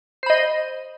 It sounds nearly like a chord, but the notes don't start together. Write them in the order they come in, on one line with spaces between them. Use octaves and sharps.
C5 B5 D#5